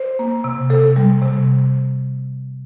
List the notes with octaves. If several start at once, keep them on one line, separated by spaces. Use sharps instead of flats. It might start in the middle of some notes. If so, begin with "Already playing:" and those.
Already playing: C5
A#3
C3
C3 A4
G3
C3